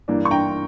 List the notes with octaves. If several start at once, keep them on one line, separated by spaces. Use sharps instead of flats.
G2 E3 A#3 D4
C#6
G5 A#5